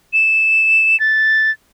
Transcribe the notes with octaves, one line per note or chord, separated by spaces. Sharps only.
E7
A6